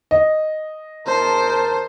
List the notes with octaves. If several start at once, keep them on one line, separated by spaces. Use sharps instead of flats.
D#5
E2 A#4 C5 A5